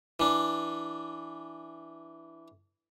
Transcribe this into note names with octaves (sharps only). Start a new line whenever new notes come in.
E3 D4